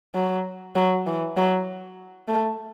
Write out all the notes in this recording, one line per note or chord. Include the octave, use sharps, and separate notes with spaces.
F#3
F#3
E3
F#3
A3